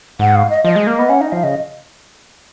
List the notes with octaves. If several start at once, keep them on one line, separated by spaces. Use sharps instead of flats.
G#2 F#5
F5
D#5
F3 D#5
G#3
A#3
B3
C#4 F#5
D#4 D#5
F3 F5
C#3 D#5